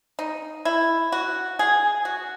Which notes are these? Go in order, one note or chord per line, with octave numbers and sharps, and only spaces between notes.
D#4
E4
F#4
G#4
F#4